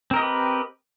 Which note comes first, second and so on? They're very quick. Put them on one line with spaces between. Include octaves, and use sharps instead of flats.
C4 A#4 D#5 G4 B4